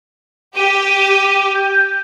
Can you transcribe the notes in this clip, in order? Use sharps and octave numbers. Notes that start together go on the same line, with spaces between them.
G4 D#7
G6